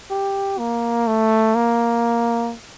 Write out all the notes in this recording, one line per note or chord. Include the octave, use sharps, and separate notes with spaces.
G4
A#3
A3
A#3